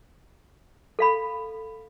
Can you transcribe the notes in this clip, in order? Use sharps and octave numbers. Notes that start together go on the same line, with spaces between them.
A4 F5 B5